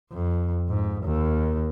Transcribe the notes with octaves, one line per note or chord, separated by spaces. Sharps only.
F2
G#2
D#2